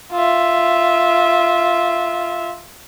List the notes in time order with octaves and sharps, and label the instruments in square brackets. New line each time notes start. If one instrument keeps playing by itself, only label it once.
[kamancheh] F4 E5